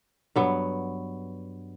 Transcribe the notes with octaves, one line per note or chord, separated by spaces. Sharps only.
G2 F#3 B3